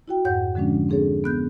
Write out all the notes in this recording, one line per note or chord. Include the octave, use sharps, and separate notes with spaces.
E4 F#4 G5
F2 G#2 C#5 F#5 G6
D3 F3 G#3 C#4 D4
C4 D4 G#4 A4 C#5
B3 F#6 G6